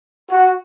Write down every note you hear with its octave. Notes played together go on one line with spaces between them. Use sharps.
F#4